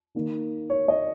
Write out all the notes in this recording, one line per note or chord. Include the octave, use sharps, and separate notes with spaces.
D#3 A#3 D#4
C#5
D#5